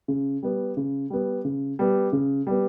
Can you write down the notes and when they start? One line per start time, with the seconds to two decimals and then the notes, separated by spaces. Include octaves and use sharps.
0.08 C#3
0.43 G3 B3
0.77 C#3
1.10 G3 B3
1.45 C#3
1.79 G3 B3
2.12 C#3
2.47 G3 B3